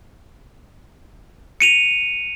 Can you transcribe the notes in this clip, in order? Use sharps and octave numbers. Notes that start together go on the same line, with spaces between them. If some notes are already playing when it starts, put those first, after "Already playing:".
C#7 D#7 F7